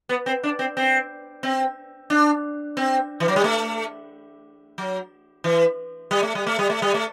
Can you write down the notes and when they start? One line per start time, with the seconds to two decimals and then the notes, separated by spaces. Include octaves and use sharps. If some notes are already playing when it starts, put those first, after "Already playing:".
0.09 B3
0.26 C4
0.43 D4
0.59 C4
0.77 C4
1.43 C4
2.10 D4
2.77 C4
3.20 E3
3.28 F#3
3.36 G3
3.44 A3
4.78 F#3
5.44 E3
6.11 G3
6.23 A3
6.35 G3
6.47 A3
6.59 G3
6.70 A3
6.82 G3
6.94 A3